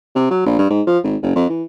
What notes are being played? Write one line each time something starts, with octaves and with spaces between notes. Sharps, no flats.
C3
F#3
A#1
G2
G#2
F3
G#1
F#1
F2
E3